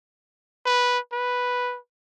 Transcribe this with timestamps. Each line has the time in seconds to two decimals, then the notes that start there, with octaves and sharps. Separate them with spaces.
0.66 B4
1.12 B4